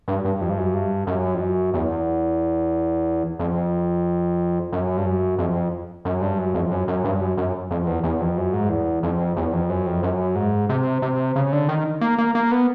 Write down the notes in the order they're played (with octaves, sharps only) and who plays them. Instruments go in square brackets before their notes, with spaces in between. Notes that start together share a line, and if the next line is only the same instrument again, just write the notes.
[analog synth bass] G2
G2
F2
G2
F#2
G2
F#2
F2
F#2
E2
F2
F#2
G2
F#2
F2
F#2
G2
F#2
F2
F#2
F#2
G2
F#2
F#2
F2
E2
E2
F2
F#2
G#2
E2
F2
E2
F2
F#2
F2
F#2
G#2
C3
C3
C#3
D3
D#3
A#3
A#3
A#3
B3